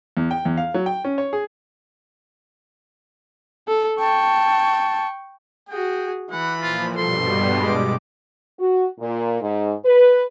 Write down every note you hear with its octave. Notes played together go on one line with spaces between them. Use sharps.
E2
G5
E2
F5
F#3
G5
C#4
C#5
G#4
A4
G5 A5 C#6
F#4 G#4 G5
E3 F#5 B5
A#2 F3 F4
G2 B2 G3 A4 C6
G#3 D6
F#4
A#2
G#2
B4